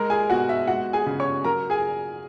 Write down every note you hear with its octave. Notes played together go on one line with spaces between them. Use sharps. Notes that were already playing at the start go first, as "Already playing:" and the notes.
Already playing: G#3 A#4 A#5
G#4 G#5
B2 F#4 F#5
E5
G#3 F#4 F#5
G#4 G#5
C#3
C#5 C#6
F#3 A#4 A#5
G#4 G#5